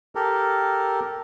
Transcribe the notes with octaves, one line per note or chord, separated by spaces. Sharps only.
G4 A4 A#4